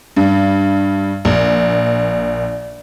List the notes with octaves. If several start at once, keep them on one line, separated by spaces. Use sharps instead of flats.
G2
A#1